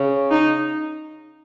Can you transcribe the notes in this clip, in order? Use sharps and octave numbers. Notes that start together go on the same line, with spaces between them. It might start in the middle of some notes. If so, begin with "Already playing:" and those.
Already playing: C#3
D#4